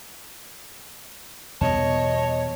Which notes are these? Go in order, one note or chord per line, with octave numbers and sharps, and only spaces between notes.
E2 B2 G3 C#5 D#5 A5